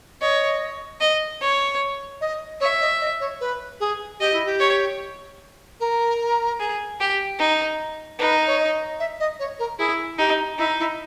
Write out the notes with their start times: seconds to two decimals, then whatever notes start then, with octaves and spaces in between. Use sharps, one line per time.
0.21 C#5 D#5
1.01 D#5
1.41 C#5
2.21 D#5
2.61 C#5 E5
2.81 D#5
3.00 D#5
3.20 C#5
3.41 B4
3.80 G#4
4.20 G4 D#5
4.33 E4
4.45 G4
4.60 C#5
5.80 A#4
6.60 G#4
7.00 G4
7.39 D#4
8.19 D#4 B4
8.47 C#5
8.59 D#5
9.00 E5
9.20 D#5
9.39 C#5
9.59 A#4
9.78 E4 G#4
10.18 D#4 G4
10.58 D#4 E4
10.79 E4